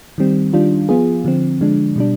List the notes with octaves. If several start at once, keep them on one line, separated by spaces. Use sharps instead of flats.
D#3 G3 C4
D#3 G3 D4 F4
F3 B3 F4 G#4
D3 F3 C4
D3 F3 G#3 D4
B2 G3 D4